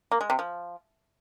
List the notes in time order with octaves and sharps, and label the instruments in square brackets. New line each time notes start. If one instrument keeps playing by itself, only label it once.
[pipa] A#3
G#3
C3
F3